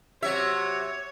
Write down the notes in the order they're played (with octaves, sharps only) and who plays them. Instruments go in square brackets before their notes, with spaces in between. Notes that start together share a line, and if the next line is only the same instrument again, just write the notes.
[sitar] C3 F#3 E5 [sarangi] C#5